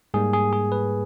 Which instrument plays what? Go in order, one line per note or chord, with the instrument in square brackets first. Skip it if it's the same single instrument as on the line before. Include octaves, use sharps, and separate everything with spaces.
[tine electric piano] G#2 G3 A#3 G#4
G#4
G#4
B4